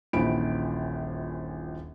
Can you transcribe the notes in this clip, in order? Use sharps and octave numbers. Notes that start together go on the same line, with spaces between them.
D#1 A#1 E3 C5 B5 D7